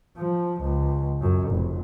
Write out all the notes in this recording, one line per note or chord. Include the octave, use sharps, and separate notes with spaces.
F3
C#2
F#2
F1